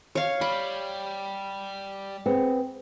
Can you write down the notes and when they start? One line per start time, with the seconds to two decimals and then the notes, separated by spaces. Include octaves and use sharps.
0.15 C#5 F5
0.41 G3 B5
2.26 B3 C4 G#4